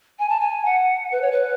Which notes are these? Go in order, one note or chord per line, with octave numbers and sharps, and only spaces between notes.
G#5
A5
G#5
F#5
B4
C#5
B4